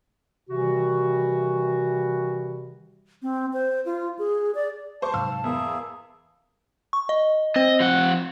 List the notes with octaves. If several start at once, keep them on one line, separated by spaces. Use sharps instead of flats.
C3 D#3 E3 G3 F#4
C4
C5
F4
G#4
D5
C5 A5 C#6 D6
G#2 C3 F#3 F5 E6
E2 A#3 G#4 E5
C#6
D#5
C4 C5 D#5
F3 F#5